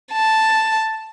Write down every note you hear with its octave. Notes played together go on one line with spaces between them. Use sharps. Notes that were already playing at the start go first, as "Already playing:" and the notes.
A5